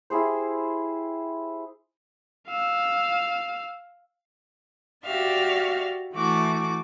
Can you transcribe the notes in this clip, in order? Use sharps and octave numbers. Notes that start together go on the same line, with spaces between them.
E4 G4 G#4 C5
F5 E6
F#4 G4 D5 E5 F5
E3 A3 F#4 D6